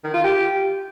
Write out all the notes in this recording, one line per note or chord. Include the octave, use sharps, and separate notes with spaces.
D#3
F4
G4